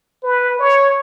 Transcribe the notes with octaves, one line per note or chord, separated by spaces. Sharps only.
B4
C#5